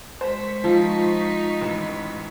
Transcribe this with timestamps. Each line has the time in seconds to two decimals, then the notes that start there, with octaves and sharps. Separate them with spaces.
0.21 G#3 C5 C#6 B6
0.64 F3 D#4 F4
1.61 A1